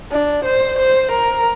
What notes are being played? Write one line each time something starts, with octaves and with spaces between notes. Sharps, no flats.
D4
C5
C5
A#4